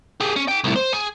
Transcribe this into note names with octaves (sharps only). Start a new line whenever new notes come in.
G4 G#4
C#4
G#4 G5
C2 A2
C5
G#4